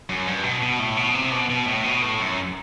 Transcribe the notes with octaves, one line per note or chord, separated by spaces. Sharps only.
F#2
G2
B2
B2
A2
B2
C3
B2
B2
A2
B2
A2
F#2